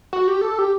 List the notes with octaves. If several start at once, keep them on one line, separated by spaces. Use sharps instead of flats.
F#4
G4
A4
G4